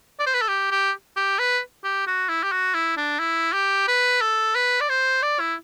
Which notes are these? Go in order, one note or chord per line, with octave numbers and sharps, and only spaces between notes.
D5
C5
B4
A4
G4
G4
G4
B4
G4
F#4
E4
G4
F#4
E4
D4
E4
G4
B4
A4
B4
D5
C5
D5
E4